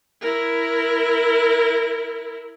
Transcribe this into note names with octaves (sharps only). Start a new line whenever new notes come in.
E4 A#4